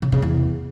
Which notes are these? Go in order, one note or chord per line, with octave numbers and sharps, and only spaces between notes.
C#3
C#3
E2